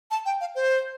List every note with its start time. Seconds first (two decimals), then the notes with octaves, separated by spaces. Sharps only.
0.11 A5
0.26 G5
0.41 F5
0.55 C5